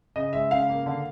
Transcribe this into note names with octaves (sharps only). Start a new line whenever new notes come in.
C#3 D#5
G#3 E5
C#3 F5
A#3
D3